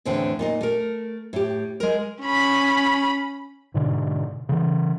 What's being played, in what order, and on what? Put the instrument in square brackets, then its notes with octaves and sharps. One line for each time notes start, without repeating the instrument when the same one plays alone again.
[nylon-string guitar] E2 A2 D3 C4 G5
A#2 D#4 D#5
A3 A#4
A2 G4
G#3 A#4
[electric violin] C#4 B5
[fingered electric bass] G#2 B2 D3
C#3 E3